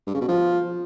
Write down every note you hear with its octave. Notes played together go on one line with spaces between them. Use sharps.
G2
C#3
B2
F3